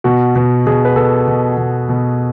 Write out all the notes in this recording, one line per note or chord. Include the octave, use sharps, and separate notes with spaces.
B2 F#4
B2
B2 G#4
B4
B2 A4
B2
B2
B2